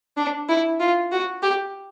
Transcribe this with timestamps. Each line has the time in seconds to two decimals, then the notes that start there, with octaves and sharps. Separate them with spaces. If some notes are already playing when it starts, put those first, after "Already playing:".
0.17 D4
0.49 E4
0.80 F4
1.12 F#4
1.43 G4